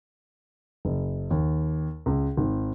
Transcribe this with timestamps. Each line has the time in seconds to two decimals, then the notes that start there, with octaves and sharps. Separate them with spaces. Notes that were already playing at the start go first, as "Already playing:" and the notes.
0.85 F#1
1.31 D#2
2.06 C#2
2.37 G#1